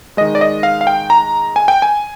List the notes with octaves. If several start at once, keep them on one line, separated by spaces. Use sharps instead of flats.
D#3 G#3 D#5
D5
D#5
F5
F5
G5
A#5
G#5
G5
G#5